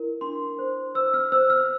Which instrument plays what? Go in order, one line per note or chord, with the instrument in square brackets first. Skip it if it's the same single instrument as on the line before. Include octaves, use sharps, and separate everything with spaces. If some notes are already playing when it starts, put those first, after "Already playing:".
Already playing: [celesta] E4 A#4
D4 C6
C5
C5 E6
F6
C5 E6
F6